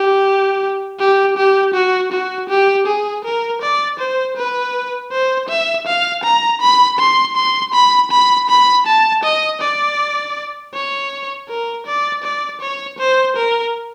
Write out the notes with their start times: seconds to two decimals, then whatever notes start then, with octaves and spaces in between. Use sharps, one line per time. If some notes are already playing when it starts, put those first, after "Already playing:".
Already playing: G4
0.99 G4
1.37 G4
1.74 F#4
2.12 F#4
2.49 G4
2.86 G#4
3.24 A#4
3.61 D5
3.99 C5
4.37 B4
5.11 C5
5.49 E5
5.87 F5
6.24 A#5
6.61 B5
6.99 C6
7.36 C6
7.73 B5
8.11 B5
8.49 B5
8.86 A5
9.24 D#5
9.61 D5
10.73 C#5
11.49 A#4
11.86 D5
12.23 D5
12.61 C#5
12.98 C5
13.36 A#4